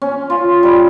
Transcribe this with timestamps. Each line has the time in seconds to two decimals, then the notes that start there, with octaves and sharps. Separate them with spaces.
0.02 C#4
0.30 F4
0.63 G3